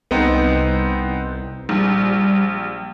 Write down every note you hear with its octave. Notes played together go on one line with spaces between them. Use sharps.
C2 B3 C4 D#4
A#1 G3